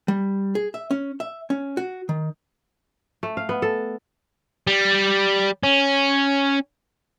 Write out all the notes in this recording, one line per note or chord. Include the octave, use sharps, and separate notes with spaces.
G3
G#4
E5
C#4
E5
C#4
F#4
D#3
A3
F5
B3
A4
G3
C#4